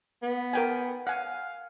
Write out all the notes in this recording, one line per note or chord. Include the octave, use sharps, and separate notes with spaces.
B3
A#4 G5 G#5
F5 F#5 G#5